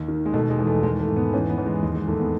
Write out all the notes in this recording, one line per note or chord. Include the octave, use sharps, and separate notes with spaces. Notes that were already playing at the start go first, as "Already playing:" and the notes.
Already playing: D#2
D#3
G#3
B2 A3
G#3
E2
A3
D#3 G#3
A3
G#2
B3
E2 C#4
B3
E2
G#3
D#2 G#3
G#3
D#2 A3
B3